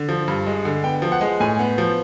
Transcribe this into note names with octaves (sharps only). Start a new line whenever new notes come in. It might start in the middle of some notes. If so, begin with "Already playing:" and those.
Already playing: D3
F3
G2
G#3
D3
B3 G5
F3
F#5
G#3
A2 G#5
B3
F3